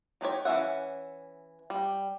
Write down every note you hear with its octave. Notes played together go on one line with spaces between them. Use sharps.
F#3 D#4 G4 C#5
E3 C#4 D#4 E5 F#5
G3